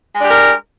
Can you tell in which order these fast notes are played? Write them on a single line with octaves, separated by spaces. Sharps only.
G#3 D4 G4 A#4